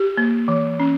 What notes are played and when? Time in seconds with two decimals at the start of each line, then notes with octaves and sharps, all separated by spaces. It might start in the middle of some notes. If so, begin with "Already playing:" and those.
Already playing: G4
0.17 A#3
0.48 E3
0.80 C#4